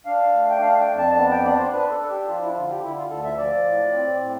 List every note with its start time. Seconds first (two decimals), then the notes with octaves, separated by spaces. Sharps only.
0.06 D4 F5
0.33 A3
0.50 G5
0.62 D4 F5
0.79 G5
0.90 F2
0.98 A5
1.16 B3 A5
1.31 G5
1.45 D4 D5
1.58 C5
1.72 D4 B4
1.90 A4
1.99 D4
2.10 G4
2.28 F3 F4
2.41 E4
2.55 D3 F4
2.70 G4
2.83 D3 E4
2.96 F4
3.10 D2 A4
3.24 E5
3.38 F3 D5
3.65 A2
3.93 C4
4.21 A2